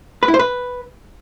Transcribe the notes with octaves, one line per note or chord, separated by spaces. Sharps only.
B4
E4
C5
B4